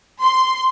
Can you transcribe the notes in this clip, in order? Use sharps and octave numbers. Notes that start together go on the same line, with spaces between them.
C6